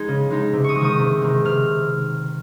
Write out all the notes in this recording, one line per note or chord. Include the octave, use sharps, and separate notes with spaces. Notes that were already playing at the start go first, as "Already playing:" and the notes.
Already playing: G#3 D#4 G#6
C#3
G#3 D#4
C3
C#6 D#6
G#3
D#3 D#6
C3
D#3 G#3
C3 F6